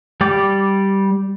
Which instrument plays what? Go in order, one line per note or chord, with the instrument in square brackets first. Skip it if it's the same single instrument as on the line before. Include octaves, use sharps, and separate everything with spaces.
[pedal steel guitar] G3 D5 G5 D6